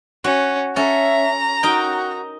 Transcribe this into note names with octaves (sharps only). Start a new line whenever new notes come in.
C#4 F#4
C#4 A4 E5 A#5
D#4 F#4 A#4 G5